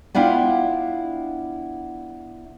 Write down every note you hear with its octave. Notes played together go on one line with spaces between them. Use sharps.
B3 D4 E4 F4 F5 G5